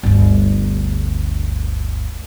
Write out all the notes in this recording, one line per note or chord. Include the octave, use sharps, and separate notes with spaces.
G1 D2